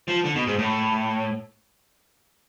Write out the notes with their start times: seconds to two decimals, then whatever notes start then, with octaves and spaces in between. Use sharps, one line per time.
0.08 F3
0.24 D3
0.36 B2
0.47 G#2
0.58 A2